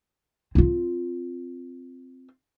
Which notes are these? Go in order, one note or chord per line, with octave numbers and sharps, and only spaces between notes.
C4 F4